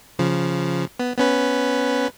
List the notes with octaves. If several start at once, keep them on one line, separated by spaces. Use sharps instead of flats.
C#3 F3
B3
B3 C#4 B4